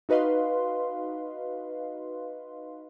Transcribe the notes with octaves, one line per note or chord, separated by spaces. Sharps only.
D#4 F#4 B4 D#5 F5 C6